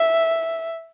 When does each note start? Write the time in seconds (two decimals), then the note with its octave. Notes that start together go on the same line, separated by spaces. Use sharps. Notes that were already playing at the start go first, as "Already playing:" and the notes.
Already playing: E5